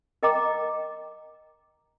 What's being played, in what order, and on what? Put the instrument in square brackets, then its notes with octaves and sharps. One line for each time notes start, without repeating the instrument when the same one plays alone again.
[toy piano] A#4 D#5 G5 A#5 D6